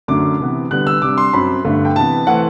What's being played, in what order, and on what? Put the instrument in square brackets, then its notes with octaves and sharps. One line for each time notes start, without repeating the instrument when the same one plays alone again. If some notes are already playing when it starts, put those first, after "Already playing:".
[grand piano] F#2 D3 A3 D4 D6
C3 E3 B3
D3 G3 B3 F#6
E6
C3 G3 D4 D6
C6
F#2 F#3 C4 B5
G2 D3 A3
G5
C3 E3 B3 A5
E3 A3 C4 F#5